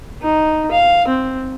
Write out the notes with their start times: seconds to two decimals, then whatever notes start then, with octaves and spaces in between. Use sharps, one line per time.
0.22 D#4
0.71 F5
1.08 C4